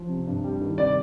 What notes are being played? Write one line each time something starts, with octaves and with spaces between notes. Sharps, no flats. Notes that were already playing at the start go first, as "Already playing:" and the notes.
Already playing: F3
C3
G2
G3
D#3
C3 D5